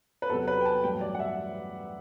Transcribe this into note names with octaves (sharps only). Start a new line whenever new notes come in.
B4
E2 C3 F#3 A4
B4
G5
A5
A1 G2 F#3 G5
D5
F#5
E5